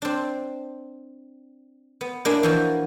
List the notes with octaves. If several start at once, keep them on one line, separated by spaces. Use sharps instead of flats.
C4 D4
B3
A#3 D4 E4 E5 G#5
E3 F3 F#4